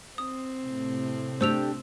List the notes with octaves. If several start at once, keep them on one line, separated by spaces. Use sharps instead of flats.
C4 D#6
A2 C3
A3 D4 G4 C5 E6 F7